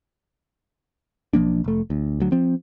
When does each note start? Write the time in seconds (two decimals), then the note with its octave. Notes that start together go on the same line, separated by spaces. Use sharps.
1.33 B1 F3 A#3 D4
1.64 F1 A3
1.90 D2
2.20 D2 F#3
2.32 F3 C4